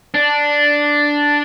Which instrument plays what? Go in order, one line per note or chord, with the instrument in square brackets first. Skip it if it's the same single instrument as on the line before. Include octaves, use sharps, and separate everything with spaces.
[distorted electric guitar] D4